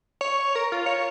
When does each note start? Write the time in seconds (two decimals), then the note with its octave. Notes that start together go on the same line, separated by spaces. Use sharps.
0.21 C#5
0.55 A#4
0.72 F4
0.86 C#5